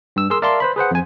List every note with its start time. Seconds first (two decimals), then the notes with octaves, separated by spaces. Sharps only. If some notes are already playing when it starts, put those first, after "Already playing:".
0.16 G2 E6
0.30 G#4 A#4 C6 E6
0.42 A#4 D5 E5 F5 A5 C6
0.60 B4 C5 B5
0.76 G#4 B4 C5 F#5
0.91 F2 G#5